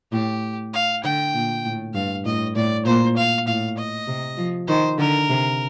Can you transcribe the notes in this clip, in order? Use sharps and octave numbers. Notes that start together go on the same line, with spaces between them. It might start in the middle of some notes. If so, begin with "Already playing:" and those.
A2 G4
F5
D3 G5
A#2
A2
G2 F5
A2 D#5
A2 D5
A#2 C5
F5
A2 F5
D#5
C3
F3
D#3 C5
D3 A#4
C3